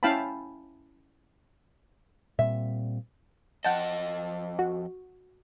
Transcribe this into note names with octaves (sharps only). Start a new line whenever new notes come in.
C#4 E4 F5 G5 A5 B5
A#2 G3 C4 E5
F2 F3 D#5 F#5 G5 A5
F#4